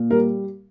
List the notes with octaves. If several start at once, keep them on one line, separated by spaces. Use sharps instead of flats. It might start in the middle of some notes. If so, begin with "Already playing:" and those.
Already playing: A#2
G3 A#4